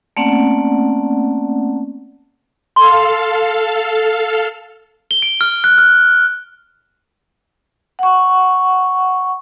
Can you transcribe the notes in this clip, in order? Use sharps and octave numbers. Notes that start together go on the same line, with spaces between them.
A3 A#3 C4 C#4 D5 F#5
A4 F5 C6
G7
D7
F6
F#6
F6
F#5 C#6